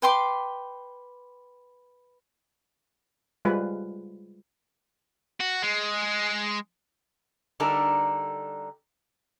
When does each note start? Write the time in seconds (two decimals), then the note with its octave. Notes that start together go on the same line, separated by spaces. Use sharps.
0.02 B4 G5 C6 D6
3.45 G3 G#3 F4 B4 C5
5.41 F#4
5.63 G#3
7.60 D3 G3 D4 D#4 A4 A#4